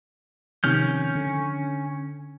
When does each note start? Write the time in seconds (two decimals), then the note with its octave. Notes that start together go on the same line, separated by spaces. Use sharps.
0.64 C3 D#3 F3 C#4 F6 G6
1.16 D3